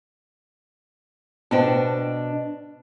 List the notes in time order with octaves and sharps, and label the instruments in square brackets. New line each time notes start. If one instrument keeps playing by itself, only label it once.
[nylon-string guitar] B2 D4 G5 [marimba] B3 C5